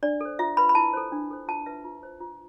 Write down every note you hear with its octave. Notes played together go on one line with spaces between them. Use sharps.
D4 D5
A4 C5
F4 E5
B4 B5
B5
E4 A5
A4 C5
D4
A4 C5
F4 A5
B4 E5
F4
C5
F4